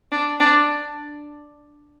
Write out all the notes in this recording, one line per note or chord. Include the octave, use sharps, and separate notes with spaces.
D4
D4